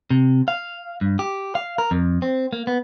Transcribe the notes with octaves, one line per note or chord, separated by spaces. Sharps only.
C3
F5
G2
G4
F5
A#4
F2
C4
A#3
B3